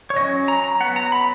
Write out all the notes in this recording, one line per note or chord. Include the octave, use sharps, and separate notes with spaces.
C#5
F#3 C#4 D#5
A#5
A#5
F#3 B3 F#5
A#5
B5